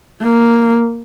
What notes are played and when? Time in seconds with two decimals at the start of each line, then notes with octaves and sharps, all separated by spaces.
0.22 A#3